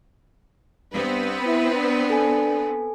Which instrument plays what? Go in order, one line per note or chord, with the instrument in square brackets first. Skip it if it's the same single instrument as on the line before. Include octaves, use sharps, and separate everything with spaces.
[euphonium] G2 [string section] B3 C4 B4
[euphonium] E4
D4
[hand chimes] A4 G#5